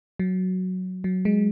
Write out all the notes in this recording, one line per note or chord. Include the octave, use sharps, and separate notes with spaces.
F#3
F#3
G#3